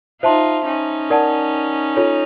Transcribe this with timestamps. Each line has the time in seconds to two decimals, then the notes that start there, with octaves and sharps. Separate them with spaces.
0.23 D#4 F4 C5 E5 A5 C6
0.66 C#4 D#4
1.10 A#4 D5 F#5 A5
1.96 F4 A4 C#5